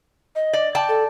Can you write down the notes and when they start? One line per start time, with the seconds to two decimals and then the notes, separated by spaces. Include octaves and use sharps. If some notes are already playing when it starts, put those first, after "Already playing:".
0.36 D#5
0.53 D5
0.75 D5 G5 A5
0.89 A4